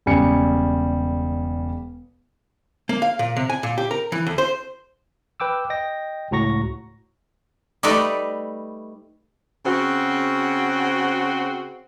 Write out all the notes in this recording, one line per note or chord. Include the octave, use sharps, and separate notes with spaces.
E1 C#3 G3 G#5 C#7
A#3
F5
A#2
C3
G#5
A#2
G4
A#4
E3
D2
C5
B4 G5 D6 E6
D#5 G5 A#6
C#2 A2 F#4 A#5 C#6 A#6
G3 A3 D#4 B4 D5
C#3 C4 F#4